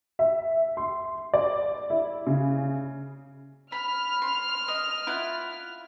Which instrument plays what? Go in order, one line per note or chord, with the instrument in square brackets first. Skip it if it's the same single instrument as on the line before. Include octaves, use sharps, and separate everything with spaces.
[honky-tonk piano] E5
C6
D5
E4
C#3
[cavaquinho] B5 [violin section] F6
[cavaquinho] C6
D#5
E4 F4 F#5